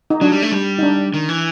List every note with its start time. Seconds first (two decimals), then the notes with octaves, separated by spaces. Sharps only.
0.10 D#4
0.21 F#3 D4
0.32 G3
0.42 A3
0.52 G3
0.79 D#4
0.83 D4
1.14 D#3
1.29 E3